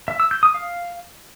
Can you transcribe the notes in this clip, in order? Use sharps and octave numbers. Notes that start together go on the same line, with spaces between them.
E5
E6
G6
D#6
F5